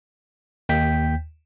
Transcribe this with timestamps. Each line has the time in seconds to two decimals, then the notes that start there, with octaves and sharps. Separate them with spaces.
0.69 D#2 G5 G6 B6